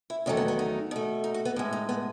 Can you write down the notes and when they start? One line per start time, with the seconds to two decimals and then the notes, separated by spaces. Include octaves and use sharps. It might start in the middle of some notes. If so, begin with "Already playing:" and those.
0.10 E4
0.26 E2 D#3 F#3 A3 C#4
0.37 B3
0.48 B3
0.59 D#4
0.91 B2 A3
1.24 D#4
1.34 F#4
1.45 B3
1.56 A2 G#3
1.73 D#4
1.89 B3